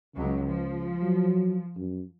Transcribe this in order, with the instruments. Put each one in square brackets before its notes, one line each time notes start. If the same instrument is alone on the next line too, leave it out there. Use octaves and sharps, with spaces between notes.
[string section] C#2 F#3 [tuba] C#3
[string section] F3
[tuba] F#3
F#2